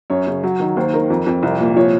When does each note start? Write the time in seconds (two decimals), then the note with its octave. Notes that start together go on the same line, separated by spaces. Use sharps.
0.10 F#2 C#5
0.27 C#3
0.43 F#3
0.60 D#3
0.76 D#2 C5
0.94 D#3 A#4
1.10 F2
1.26 F2
1.43 C2
1.60 A#2
1.76 F3 C#5